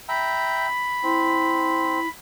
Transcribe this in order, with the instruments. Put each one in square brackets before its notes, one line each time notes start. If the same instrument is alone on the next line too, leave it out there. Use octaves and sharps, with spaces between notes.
[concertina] E5 G5 A#5 [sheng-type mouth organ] B5
[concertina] C4 [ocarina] E4